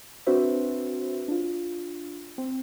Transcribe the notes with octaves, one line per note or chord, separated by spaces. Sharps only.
C4 D4 F#4 B4 C5 E5
D4 F4
C4